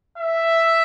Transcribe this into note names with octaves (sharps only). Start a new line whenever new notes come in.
E5